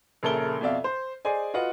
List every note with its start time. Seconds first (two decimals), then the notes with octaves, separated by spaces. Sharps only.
0.23 A#1 C#3 A4 A#4 E5 G7
0.61 F2 B2 D5 E5 F5
0.84 C5
1.25 G#4 C5 D5 D#5 G#5
1.54 F4 F#4 B4 D#5 F#5